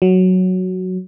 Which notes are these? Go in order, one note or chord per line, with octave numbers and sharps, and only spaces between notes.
F#3